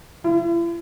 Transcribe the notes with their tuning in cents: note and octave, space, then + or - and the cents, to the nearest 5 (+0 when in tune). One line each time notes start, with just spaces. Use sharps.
E4 +45